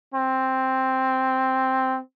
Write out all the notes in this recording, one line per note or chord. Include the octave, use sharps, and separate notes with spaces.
C4